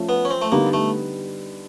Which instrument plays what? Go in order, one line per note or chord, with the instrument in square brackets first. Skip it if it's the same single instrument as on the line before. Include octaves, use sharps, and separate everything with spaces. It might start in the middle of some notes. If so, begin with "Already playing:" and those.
Already playing: [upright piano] F3 A3 C#4 F4
[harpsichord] B3
C#4
C4
A3
[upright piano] D3 G3 B3 D#4 [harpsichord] A#3
[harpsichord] A3